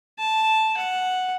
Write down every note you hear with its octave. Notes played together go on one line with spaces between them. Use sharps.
A5
F#5